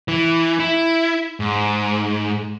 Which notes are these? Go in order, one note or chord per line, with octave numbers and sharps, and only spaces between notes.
E3
E4
G#2